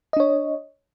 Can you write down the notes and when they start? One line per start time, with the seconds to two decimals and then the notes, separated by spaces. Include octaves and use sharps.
0.13 D#5
0.17 D4
0.20 C#5